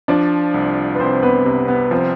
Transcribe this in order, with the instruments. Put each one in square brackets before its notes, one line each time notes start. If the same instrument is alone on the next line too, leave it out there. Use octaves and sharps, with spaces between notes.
[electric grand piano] F3 [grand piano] D4 D5
[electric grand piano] C2
[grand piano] B4
[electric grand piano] C2 [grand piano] C4 C5
[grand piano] B3 B4
[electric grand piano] C3
[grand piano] B3
[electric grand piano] F3 [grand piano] C4